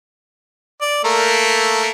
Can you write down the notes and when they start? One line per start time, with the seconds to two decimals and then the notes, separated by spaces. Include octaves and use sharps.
0.81 D5
1.05 A3 A#3 A#4